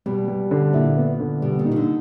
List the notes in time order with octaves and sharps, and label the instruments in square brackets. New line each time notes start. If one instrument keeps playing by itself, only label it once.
[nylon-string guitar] B2 [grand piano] G3
[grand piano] G3
D3
[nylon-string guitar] A#2 [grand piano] E4
[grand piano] B3
D3
[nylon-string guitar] B2 [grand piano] G3
[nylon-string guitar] A#2
[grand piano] D#4
[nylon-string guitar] D#3
D3